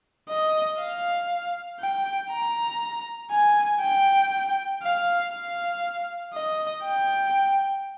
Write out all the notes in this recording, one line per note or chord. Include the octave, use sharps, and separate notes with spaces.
D#5
F5
G5
A#5
G#5
G5
F5
F5
D#5
G5